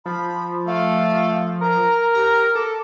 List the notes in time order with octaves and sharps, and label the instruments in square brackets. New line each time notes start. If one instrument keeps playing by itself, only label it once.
[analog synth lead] F3 [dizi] B5
[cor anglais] A3 [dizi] F5
[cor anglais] A#4 [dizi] A#5
[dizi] G4 [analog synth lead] A#5
[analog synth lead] A4 [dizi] D6